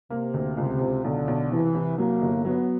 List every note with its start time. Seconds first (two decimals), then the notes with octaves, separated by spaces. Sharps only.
0.10 C3 A#3
0.34 D2
0.57 C#2 C3
0.81 C#2
1.04 B1 D3
1.28 B1
1.51 C2 E3
1.75 C2
1.98 F#3 A#3
2.22 G1
2.45 F#3 B3